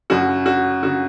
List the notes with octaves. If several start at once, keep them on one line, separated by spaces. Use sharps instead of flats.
F#2 C#3 F#4
F#4
C#3 F#4